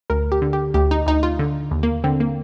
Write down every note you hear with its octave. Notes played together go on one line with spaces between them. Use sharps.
D2 A#4
G4
D3
G4
D2 G4
D#4
D2 D#4
F4
D3
D#2
A#3
D3 C4
A#3